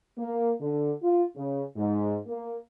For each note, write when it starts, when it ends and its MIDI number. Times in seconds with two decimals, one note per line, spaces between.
0.18 0.51 58
0.60 0.91 50
1.01 1.23 65
1.35 1.63 49
1.76 2.16 44
2.27 2.55 58